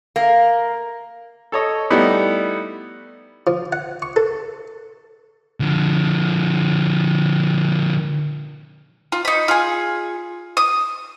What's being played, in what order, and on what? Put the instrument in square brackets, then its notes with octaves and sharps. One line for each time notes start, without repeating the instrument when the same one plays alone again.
[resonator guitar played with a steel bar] A#3
[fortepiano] A4 C#5 D#5
G3 A3 B3 D#4 E4
[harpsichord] F3
F#5
C#6
A4
[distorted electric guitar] D3 F3
[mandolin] F4
D#4 B5
F4 G#4
D#6